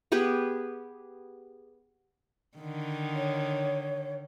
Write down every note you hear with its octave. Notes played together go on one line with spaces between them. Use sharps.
B3 G4 G#4 B4
D3 D#3
C#5